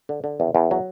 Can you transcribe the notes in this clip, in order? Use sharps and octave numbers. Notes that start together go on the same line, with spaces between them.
D3
D3
E2
E2
F#3